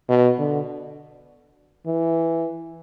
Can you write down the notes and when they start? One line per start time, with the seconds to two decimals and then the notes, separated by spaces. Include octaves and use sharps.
0.09 B2
0.39 D3
1.86 E3